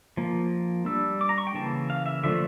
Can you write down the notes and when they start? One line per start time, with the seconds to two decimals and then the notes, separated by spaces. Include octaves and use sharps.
0.17 F3 A#3
0.86 G3 D4 E6
1.21 D6
1.29 A#5
1.38 C#6
1.47 G5
1.54 C#3 E3 A#3 A5
1.90 F5
2.06 E5
2.24 D3 F3 A3 E5